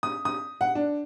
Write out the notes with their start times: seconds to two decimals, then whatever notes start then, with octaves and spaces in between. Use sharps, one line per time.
0.03 D#6
0.25 D#6
0.61 F#5
0.75 D4